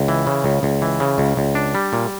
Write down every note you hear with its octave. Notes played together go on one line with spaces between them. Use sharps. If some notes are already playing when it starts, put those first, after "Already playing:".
Already playing: C#2
E3
C#3
C#2
C#2
E3
C#3
C#2
C#2
D4
G3
A#2